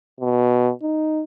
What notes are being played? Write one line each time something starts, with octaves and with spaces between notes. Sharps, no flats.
B2
D#4